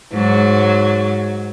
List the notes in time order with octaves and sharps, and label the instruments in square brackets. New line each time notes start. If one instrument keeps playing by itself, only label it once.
[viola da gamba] G#2 F#3